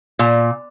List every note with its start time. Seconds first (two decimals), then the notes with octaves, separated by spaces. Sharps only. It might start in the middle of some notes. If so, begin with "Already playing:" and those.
0.19 A#2